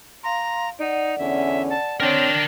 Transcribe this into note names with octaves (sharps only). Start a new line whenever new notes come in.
F5 A#5 C6
D#4 D5 F#5
E2 D3 C#4 E5
A5
C4 D4 A#4 C#5 G5